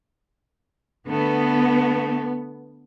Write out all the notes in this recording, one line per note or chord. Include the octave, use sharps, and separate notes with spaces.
D3 A3 B3